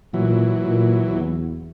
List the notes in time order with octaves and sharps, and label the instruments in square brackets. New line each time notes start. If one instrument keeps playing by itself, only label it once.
[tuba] A#2 [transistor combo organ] E3 F#3
[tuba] A#2
E2